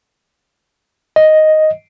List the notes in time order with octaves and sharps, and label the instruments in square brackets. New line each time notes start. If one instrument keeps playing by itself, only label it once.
[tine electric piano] D#5